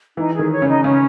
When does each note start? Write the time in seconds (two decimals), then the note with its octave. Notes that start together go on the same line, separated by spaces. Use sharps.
0.17 E3 D#4
0.34 G#4
0.39 D#3
0.50 C#5
0.62 C#3
0.67 D#4
0.84 C#3 C#4